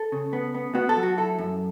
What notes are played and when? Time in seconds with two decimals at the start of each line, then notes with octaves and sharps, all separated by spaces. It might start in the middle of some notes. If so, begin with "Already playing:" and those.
Already playing: A4
0.12 C#3
0.33 B3
0.55 B3
0.75 B3 F#4
0.89 A4
0.97 F#3
1.03 F#4
1.17 E4 A4
1.38 F#2